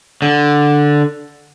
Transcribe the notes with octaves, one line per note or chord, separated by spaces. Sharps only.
D3